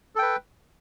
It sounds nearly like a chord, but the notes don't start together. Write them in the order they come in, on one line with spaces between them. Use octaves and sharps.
A4 G5 B4